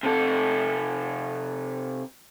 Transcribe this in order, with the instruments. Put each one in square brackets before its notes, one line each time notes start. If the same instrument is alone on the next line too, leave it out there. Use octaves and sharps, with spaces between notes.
[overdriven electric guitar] C3 A4